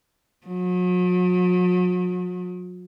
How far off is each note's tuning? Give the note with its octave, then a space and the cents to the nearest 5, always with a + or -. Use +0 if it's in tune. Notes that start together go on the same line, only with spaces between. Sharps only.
F#3 -45